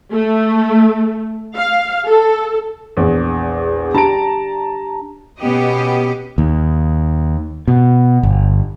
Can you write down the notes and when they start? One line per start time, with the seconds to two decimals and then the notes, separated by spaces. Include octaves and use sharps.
0.12 A3
1.56 F5
2.07 A4
2.97 A#1 E2
3.95 D4 G4 A5 A#5 D7
5.40 B2 B3 C#4 G4 D#5
6.38 D#2
7.68 B2
8.23 G1